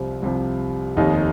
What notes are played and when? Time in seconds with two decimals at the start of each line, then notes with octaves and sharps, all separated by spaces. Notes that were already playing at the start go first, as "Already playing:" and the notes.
Already playing: C2 C3 F3 C4
0.22 C2 C3 F3
0.97 F1 D#2 D#3 D#4